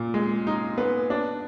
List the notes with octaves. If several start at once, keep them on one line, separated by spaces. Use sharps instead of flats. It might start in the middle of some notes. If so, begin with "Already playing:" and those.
Already playing: A#2
G#3
D#4
B3
D4